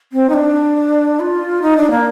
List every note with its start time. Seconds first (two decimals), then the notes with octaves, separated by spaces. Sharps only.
0.13 C4
0.29 D#4
0.34 D4
1.20 F4
1.62 D#4
1.77 D4
1.91 A#3